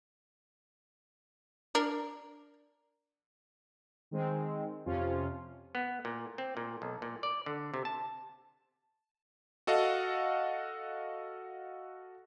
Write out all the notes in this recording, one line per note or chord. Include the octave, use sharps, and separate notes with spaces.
D4 A#4
D#3 G#3 C4
F2 C3 F3 C#4 F4
B3
A#2
C4
A#2
B1
A#2
D5
D3
C3
A5
F#4 A4 D#5 F5 F#5